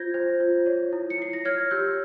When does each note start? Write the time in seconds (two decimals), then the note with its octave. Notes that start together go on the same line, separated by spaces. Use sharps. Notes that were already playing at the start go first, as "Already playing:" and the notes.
Already playing: F4 C5 G6 G#6 A#6
0.14 C5
0.40 F4
0.66 C#5
0.93 E4
1.10 C#7
1.18 E4 C7
1.33 A#6
1.45 C#5 F6 G#6
1.71 G4 E6 G6